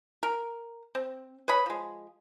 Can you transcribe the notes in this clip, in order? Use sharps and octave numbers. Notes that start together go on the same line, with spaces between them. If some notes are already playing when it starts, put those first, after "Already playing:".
A#4
C4
B4 C#5 D#5 B5
F3 G#3